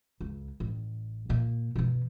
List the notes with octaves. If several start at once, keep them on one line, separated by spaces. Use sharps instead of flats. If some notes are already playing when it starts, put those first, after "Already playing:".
C#2
A1
A#2 A#3
B2 E3